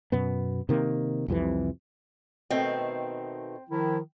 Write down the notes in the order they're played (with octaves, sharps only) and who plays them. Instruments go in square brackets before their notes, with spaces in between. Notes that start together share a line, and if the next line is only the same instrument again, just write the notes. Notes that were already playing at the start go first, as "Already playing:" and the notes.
[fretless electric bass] F#2 B2 B3
C3 D#3 A#3
C2 F2 C3 E3
[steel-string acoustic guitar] B2 D#3 A3 [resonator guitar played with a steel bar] C4
[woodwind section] D#3 F3 E4